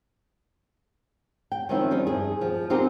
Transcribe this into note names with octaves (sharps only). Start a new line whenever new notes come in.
G5
D#3 F3 C4 C#4 E4 F4
F3 G3 D#4
G2 G#4
F3
C4 D#4 F4 G4 G#4 A#4